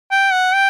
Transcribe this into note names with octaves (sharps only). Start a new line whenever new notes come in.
G5
F#5
G5